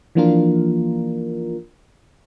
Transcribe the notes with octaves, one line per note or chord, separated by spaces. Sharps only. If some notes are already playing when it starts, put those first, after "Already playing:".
E3 F3 A#3 D4 F4 A#4